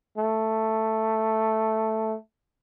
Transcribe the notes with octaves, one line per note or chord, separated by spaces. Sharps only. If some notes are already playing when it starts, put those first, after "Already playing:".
A3